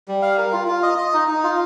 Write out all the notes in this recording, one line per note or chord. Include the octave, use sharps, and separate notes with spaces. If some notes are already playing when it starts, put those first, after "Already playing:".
G3
F5
A#4
F4
F4
D#5
D#5
D#4
D#4
F4